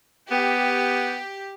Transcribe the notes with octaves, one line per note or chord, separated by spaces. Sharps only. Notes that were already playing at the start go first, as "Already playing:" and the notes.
B3 G4